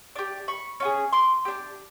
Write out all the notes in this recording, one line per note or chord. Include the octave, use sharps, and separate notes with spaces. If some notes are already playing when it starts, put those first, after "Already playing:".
D4 G4
B5 C#6
C#4 F4 G#4
C6 D6
D4 G4